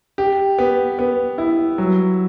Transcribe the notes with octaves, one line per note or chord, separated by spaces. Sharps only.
G4
B3
B3
E4
F#3